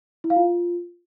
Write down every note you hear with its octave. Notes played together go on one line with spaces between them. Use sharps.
E4
F5
F4